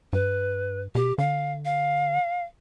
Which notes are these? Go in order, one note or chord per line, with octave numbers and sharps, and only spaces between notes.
G2 B4
B2 G4
D3 F5
F5